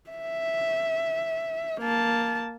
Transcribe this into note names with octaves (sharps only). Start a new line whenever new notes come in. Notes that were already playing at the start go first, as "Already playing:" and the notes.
E5
A#3 A5